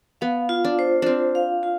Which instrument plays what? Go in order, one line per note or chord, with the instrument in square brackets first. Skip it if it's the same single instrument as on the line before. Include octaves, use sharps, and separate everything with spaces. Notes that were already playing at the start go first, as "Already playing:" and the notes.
[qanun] B3 [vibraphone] F5
[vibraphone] F4
[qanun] D4
[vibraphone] C5
[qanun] C4 D4 [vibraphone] F4
[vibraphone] F5
F4